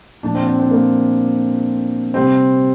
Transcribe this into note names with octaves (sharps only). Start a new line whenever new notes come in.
A#2 F3 D4
C4
C4
C4
A#3
C3 G3 C4